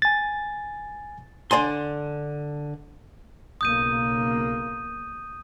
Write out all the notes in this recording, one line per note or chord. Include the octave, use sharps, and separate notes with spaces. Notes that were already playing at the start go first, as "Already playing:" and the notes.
G#5 A6
D3 D5 G#5 C6
B1 C#3 A#3 D#6 G6 D#7